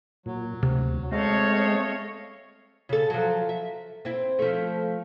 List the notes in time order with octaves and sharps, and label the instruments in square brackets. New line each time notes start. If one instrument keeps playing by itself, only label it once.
[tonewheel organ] A#2 [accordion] F#3
[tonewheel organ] D2 [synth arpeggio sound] C3
[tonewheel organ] G#3 C4 [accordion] A3 D#5 F5 [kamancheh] A4 C#5
[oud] C#3 A4
F3 F#3
E5
C4 E4
F3 A3